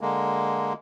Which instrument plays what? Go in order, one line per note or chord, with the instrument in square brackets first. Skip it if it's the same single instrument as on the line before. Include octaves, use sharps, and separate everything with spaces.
[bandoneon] D3 G#3 A#3